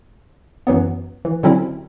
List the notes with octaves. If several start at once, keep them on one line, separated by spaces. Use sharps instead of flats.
F#2 E3 F#3 B3
E3
D3 F#3 G3 C4 C#4 E4